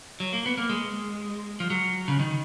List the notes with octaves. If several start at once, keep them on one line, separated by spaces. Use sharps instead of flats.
F#3
A#3
B3
A#3
G#3
F3
F#3
C#3
D#3